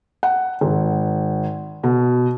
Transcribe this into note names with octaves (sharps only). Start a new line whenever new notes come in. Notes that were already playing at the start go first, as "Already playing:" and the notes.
F#5
G#1
B2